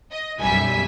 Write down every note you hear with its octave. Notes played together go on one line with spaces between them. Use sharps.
D#5
B1 F#2 G3 E5 G#5 B6